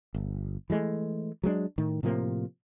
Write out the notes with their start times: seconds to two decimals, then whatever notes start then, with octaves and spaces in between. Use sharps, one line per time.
0.14 G1
0.70 E3 F#3 G#3 A3
1.44 F#3 G#3 C4 D4
1.78 A2 D#3
2.03 A2 C3 F3 A#3